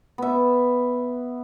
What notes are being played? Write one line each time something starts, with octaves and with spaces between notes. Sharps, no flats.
B3 E5